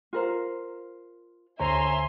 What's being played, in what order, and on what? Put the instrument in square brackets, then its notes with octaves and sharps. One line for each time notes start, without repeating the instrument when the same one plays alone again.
[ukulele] F4 A#4 C5
[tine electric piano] D2 D3 C5 [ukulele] C#5 [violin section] E5 G#5 C6 [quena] A#5